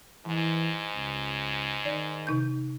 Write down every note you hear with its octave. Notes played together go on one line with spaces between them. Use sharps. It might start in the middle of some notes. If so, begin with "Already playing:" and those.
G#2 E3
C#2
D#3 D5
C3 D#4 G6